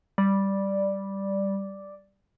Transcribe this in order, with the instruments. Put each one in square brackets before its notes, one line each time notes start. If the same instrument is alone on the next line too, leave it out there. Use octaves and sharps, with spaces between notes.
[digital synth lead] G3 [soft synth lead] D5